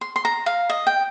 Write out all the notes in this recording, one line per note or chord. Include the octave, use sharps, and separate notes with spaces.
C6
C6
A#5
F5
D#5
G5